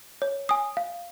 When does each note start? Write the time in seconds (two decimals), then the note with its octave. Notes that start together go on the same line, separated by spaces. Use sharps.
0.22 C#5
0.49 G#5 D#6
0.77 F5